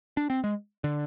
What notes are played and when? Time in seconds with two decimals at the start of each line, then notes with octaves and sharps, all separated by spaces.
0.17 D4
0.30 C4
0.44 G#3
0.84 D3